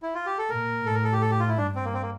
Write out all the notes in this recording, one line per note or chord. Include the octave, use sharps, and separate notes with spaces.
E4
F4
G4
A4
A#2 A#4
A2 A4
A#4
A4
G4
A4
G4
F4
E4
G2 D4
C4
A#3
C4
A#3